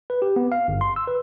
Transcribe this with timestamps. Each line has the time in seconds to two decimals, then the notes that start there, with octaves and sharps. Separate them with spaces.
0.10 B4
0.22 G4
0.36 B3
0.52 F5
0.68 G1
0.81 C6
0.96 E6
1.07 B4